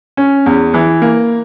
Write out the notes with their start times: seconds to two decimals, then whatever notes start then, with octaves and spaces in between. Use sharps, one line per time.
0.17 C#4
0.46 E2
0.74 E3
1.02 A#3